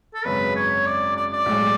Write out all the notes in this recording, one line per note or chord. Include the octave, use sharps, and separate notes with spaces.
A4
G#1 F#2 C#3 G#3 B4
C#5
D5
D5
D5
B1 A2 G#3